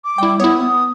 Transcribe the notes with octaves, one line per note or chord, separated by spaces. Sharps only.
D6
G3 E4 G5
B3 E4 C#5 D#6
B3